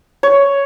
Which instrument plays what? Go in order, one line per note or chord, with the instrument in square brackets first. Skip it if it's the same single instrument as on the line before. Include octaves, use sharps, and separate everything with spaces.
[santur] C#5